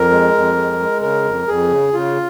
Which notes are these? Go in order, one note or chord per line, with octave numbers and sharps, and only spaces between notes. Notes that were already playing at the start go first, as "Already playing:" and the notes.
Already playing: F2 A#4
G#3
F2
G#3
G#3
C#3 A#4
F2
F2 G#4
C#3
C#3 F4